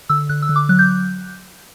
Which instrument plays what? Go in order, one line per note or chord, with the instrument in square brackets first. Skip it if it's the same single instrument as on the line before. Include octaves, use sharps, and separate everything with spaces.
[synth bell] D3 E6
D3 F#6
E6
D3
D6
F#3 F#6
G6